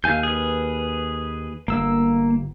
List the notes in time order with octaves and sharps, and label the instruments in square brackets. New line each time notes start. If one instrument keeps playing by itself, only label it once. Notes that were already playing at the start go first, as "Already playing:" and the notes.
[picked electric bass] D#2 [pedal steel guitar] F5 G#5 G6
[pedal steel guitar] G#4 B4
[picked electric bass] G1 [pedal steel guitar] A#3 E6